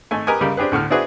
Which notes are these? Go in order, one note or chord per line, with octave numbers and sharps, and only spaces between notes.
G#1 A3 G#5
G4 A#4 B4 D#5 G#5
C#2 C#3 G3 G4 A#4
C4 D4 G4 G#4 B4
D2 A2 D3 F6
C4 D4 E4 F#4 G#4 B4